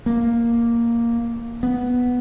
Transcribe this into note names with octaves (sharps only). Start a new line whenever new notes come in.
A#3
B3